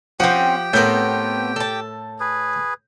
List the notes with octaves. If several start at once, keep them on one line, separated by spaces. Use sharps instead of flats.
F3 C4 C#4 G4 F#5 G5
A2 A3 B3 C4 A#4 G6
A4 A5
G#4 B4